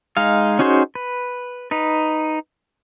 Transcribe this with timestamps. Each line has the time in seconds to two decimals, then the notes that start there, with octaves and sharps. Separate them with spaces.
0.17 G#3 D#4 F5
0.59 C#4 D#4 F#4 G#4 C5
0.95 B4
1.71 D#4 B4